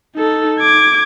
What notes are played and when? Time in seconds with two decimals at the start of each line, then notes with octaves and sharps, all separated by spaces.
0.16 D#4 A4
0.60 D6 G#6